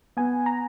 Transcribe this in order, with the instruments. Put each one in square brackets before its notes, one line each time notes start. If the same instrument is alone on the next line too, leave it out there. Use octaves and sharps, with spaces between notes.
[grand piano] B3 [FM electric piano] G#5
[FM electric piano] A#5